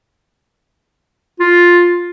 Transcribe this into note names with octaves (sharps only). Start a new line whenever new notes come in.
F4